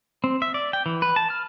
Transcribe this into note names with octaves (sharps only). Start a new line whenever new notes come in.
C4
E5
D5
G5
E3
B4
A5
F6